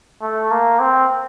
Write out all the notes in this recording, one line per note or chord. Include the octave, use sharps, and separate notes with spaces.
A3
A#3
C4